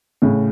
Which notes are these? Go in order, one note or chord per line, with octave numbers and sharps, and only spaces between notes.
A2 C#3